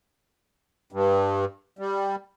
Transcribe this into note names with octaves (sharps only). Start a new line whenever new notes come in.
G2
G3